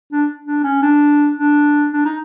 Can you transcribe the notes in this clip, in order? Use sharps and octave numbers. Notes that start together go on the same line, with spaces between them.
D4
D4
C#4
D4
D4
D4
D#4